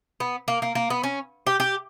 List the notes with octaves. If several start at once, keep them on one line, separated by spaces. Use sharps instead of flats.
B3
A#3
A#3
A#3
B3
C#4
G4
G4